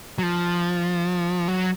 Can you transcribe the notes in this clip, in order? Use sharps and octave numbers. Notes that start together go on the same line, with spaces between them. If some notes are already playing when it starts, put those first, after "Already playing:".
F#3
F3
F#3